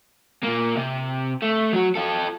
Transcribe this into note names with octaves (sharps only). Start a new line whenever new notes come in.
A#2 A#3
C3
A3
F#3 F#4
F4 A4